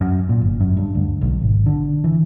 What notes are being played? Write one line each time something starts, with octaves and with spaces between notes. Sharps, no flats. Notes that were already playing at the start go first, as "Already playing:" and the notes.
F#2
A#2
G1
F#2
G2
D2
B1
G#1
D3
E3